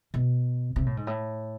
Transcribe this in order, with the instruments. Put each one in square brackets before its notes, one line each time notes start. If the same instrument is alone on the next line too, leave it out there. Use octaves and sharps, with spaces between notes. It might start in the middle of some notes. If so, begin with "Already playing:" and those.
[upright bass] B2
C3
A2
G#2
A2